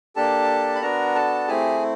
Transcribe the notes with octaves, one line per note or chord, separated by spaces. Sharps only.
A#3 D4 G4 A4 A5
B5
B3 D4 F#4 A#4 A#5
A4 A5
A3 C4 E4 G4 G#4 G#5